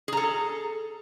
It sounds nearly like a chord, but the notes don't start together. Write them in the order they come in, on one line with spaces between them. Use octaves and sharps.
G#4 A#5 A4